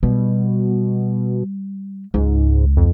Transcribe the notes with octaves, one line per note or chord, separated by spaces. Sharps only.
B2 G3
C#2 G#2
F2